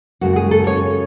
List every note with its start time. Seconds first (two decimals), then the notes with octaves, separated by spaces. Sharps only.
0.21 F#2 C#3 G#3 F#4
0.36 G#4
0.51 A4
0.67 C#5